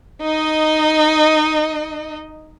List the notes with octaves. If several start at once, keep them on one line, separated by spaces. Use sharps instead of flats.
D#4 D#5